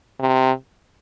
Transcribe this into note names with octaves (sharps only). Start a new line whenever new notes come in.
C3